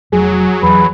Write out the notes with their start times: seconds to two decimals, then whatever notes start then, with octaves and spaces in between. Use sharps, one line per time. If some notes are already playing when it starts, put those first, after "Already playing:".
0.12 F1 F#3 G#4
0.63 E2 B4